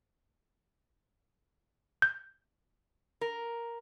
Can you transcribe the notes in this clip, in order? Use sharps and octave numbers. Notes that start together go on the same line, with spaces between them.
G6
A#4